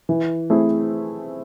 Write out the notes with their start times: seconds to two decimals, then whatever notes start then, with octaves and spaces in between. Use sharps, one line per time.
0.09 E3
0.50 A3 C4 E4 G#4